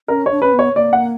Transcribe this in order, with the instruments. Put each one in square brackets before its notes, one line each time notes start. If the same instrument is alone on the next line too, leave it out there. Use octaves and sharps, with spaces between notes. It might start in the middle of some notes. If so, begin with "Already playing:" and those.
[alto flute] C#4 [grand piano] A#4
[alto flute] D4 [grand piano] C#5
[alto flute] C#4 [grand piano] B4
[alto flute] B3
[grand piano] C#5
[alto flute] A#3 [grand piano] D5
[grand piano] F#5